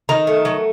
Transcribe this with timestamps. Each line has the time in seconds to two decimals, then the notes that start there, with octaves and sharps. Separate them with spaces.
0.09 D#3 A#5
0.27 A3
0.45 F#3